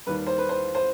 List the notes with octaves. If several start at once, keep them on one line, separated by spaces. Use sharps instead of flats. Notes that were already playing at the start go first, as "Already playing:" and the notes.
D#2 D#3 G3 B4
C5
B4
C5
C5